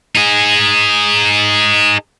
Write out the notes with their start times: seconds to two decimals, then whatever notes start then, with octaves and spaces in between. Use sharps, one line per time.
0.15 D#4 G#4